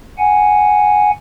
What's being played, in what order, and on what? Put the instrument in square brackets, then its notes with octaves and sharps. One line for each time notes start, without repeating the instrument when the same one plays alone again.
[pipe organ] F#5 G#5